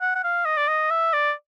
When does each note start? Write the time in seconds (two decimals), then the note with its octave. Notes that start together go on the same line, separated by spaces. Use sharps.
0.01 F#5
0.15 F#5
0.23 F5
0.45 D#5
0.57 D5
0.68 D#5
0.90 E5
1.13 D5